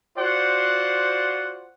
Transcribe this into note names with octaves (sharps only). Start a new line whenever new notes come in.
F4 F#4 C5 D5 F#5